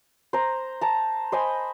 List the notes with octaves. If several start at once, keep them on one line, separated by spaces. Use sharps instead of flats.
C5 A#5
A5 A#5
C5 D#5 G#5 B5